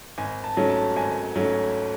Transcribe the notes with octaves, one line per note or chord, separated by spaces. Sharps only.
G#1 G#5
A5
G#2 F#3 A3 C#4
A5
G#1 G#5
G#2 F#3 A3 C#4